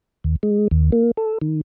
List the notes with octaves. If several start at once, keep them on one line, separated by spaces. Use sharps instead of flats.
D#2
G#3
D#2
A#3
A4
D#3